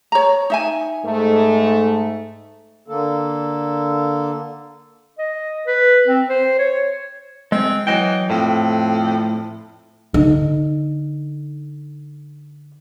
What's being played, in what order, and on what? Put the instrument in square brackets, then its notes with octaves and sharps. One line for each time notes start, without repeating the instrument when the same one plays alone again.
[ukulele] C#5 A#5
D#4 E5 G#5
[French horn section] G#2 A3
[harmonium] D3 A#3 A4
[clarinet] D#5
B4
C4
C5
C#5
[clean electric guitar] G#3 [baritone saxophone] C4
[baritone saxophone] E3 [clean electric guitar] F#3 D#5 G5
[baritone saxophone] F2 [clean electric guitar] A2
[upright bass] D3 D#4